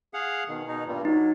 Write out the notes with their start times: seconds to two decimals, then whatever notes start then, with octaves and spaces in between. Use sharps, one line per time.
0.14 G#4 F5 F#5
0.48 B2 D#3
0.68 B2 D#4
0.87 G2 A#2 G3
1.05 F#3 D#4